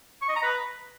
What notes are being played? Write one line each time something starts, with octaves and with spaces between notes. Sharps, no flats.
C#6
D#5
A#5
B4